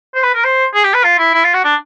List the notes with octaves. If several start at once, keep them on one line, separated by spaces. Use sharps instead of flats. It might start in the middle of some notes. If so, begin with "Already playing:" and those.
C5
B4
A#4
C5
G#4
G4
B4
F4
E4
E4
F4
F#4
D4